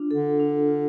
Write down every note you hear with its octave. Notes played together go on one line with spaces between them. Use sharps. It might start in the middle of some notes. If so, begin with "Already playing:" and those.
Already playing: D4 F4
D3 A4
D4
F4